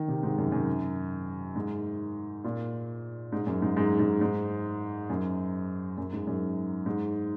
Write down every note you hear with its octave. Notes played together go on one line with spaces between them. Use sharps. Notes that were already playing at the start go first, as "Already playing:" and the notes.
Already playing: D#3
C3
G#2
F#2
F#2
G#2
A#2
G#2
F#2
G#2
G#2
G#2
G#2
F#2
F#2
G#2
F#2
G#2